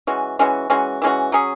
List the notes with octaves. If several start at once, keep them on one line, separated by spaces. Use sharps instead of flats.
E3 G#3 C#4 F#4
E3 G#3 C#4 F#4
E3 G#3 C#4 F#4
E3 G#3 C#4 F#4
F#3 C#4 G#4